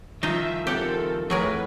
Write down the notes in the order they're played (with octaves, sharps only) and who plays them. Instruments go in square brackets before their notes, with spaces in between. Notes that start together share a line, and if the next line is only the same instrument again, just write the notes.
[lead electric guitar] D#3 F3 [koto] D#4 F4 [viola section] E5
[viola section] C4 A4 A#4 [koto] G4 F#5
[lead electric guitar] F2 [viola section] E3 A3 B4 [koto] F#3 G#4 A#4